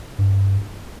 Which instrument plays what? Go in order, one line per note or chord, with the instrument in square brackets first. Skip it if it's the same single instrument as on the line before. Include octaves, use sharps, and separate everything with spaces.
[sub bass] G2